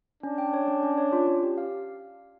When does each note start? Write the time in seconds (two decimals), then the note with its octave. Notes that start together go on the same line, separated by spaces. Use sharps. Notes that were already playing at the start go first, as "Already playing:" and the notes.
0.23 C#4 D4
0.38 G5
0.54 C#5
0.68 C#4
0.83 C#4
0.98 C#5
1.13 F4
1.28 C#4
1.43 G4
1.58 F5